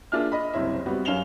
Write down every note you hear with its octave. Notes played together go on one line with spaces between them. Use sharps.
A#3 D4 F4 G#4 E5 F6
D#5 B5
F#1 C2 C4 C#5 E5
G3 B3 C4 F#4
F#2 C#4 F5 E7 F7 G7